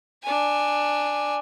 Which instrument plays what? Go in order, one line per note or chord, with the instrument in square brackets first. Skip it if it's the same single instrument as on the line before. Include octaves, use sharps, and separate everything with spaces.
[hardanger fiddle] D4 G#5